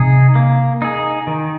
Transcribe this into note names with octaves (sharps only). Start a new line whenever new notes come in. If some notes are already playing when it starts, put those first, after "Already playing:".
Already playing: C3 D#4 G#4
A#3
D#4 G#4
D#3